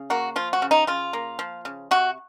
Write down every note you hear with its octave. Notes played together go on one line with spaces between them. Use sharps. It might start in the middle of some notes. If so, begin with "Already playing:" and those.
Already playing: C#3
A#3 F#4
F3 F4
F#4
C#3
D#4
C#3 F4
A#3
F3
C#3
C3 F#4